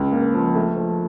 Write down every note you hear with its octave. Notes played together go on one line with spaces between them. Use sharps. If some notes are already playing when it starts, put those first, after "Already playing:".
Already playing: C#2
A#3
F3
A3
F3